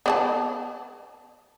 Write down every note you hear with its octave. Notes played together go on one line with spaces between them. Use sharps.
B3 D5 A5